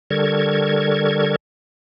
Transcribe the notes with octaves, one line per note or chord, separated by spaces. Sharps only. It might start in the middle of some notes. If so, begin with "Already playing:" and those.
D3 G3 A4 A#4 C#6 G#6